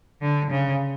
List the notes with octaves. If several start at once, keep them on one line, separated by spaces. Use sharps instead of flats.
D3
C#3